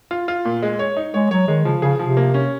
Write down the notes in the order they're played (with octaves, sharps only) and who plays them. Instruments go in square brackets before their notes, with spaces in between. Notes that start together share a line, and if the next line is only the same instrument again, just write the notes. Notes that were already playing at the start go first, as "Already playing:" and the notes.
[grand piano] F4
F4
A#2
G#3
C#5
D#4
[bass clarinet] G#3 [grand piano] C#5
[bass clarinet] F#3 [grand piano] C#5
[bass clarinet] D#3 [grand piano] G#3
[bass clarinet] C#3 [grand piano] F3
[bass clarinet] C#3 [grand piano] G#4
[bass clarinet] C3 [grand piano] F3
[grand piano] A#3
C#4